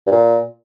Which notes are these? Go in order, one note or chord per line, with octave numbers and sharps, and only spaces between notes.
G2
A#2